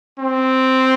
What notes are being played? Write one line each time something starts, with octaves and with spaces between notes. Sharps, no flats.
C4